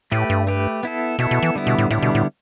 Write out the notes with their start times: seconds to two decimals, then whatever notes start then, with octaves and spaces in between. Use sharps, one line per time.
0.12 A2 A3 G4 B4
0.30 G2
0.47 A3 G4 B4
0.83 B3 E4 A4
1.19 B2 B3 E4 A4
1.31 B2
1.43 E3
1.55 D3 G3 B3 E4
1.67 B2
1.78 A2
1.90 A2 D3 G3 B3 E4
2.02 B2
2.15 A2